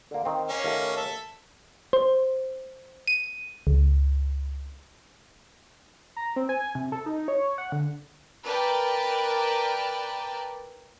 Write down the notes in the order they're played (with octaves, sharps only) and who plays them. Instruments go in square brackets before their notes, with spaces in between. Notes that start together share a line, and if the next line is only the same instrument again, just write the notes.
[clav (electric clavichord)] D3 A#3
D#3 C4
[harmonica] A#3 C#4
[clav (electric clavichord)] D#2 A3
[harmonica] A4 E5
[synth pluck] C5
D#7
C#2
[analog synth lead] A#5
C4
G#5
C3
A4
D#4
C#5
F#5
D3
[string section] A#4 B4 D5 G5 A5